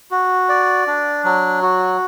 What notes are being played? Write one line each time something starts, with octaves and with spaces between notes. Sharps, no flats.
F#4
D5
D4
F#3
F#4